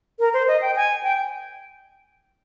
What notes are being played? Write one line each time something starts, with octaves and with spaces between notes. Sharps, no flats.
A#4
C5
D#5
G5
G#5
G5